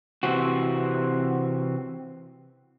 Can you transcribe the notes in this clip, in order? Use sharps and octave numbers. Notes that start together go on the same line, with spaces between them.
C3 E3 C4 F#4